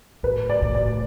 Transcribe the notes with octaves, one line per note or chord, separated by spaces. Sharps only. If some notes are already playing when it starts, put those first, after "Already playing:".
A2 B4
D5
A2
D5